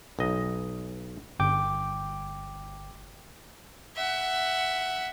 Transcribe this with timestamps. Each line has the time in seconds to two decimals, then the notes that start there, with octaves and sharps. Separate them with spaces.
0.19 B1 D#5
1.39 G1 G5 D6
3.96 E5 F#5